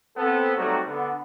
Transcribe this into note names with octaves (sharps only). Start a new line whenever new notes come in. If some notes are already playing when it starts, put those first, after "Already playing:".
B3 C4 A4
F#3 G3 A3 C4 D#4 F#4
D3 B3